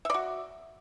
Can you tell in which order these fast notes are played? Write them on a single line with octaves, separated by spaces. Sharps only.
E5 D5 F#4